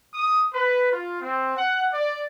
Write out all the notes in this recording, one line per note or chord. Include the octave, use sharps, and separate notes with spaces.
D#6
B4
F4
C4
F#5
D5